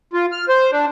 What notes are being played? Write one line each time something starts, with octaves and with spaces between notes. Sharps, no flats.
F4
F6
C5
D4